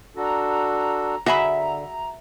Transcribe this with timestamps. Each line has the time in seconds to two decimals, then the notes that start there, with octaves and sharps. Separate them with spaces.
0.17 D4 F#4 A4 A#5
1.26 D3 F#4 G#4 E5 B5